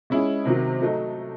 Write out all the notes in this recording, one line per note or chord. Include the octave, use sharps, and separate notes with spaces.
G#3 C#4 E4 G#4
C3 D#3 F#3
F#3 A3 D#4